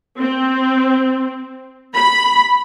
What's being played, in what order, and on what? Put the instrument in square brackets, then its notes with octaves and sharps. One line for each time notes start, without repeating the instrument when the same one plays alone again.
[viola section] C4
B5